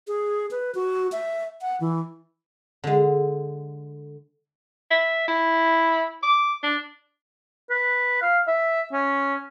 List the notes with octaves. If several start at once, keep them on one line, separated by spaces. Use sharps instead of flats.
G#4
B4
F#4
E5
F#5
E3
D3 G#3
E5
E4
D6
D4
B4
F5
E5
C#4